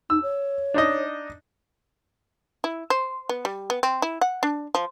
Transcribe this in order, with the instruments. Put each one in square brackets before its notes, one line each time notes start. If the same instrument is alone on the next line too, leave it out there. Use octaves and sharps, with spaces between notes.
[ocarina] D#4 [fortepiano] E6
[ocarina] C#5
[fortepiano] D4 D#4 D#5
[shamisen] E4
C5
B3
G3
B3
C4
E4
F#5
D4
F3